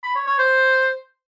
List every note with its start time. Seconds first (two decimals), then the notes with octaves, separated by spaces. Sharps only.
0.04 B5
0.15 C#5
0.27 C#5
0.39 C5